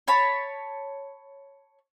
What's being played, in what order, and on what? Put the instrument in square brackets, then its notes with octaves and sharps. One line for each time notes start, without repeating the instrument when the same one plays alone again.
[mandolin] C#5 A5 B5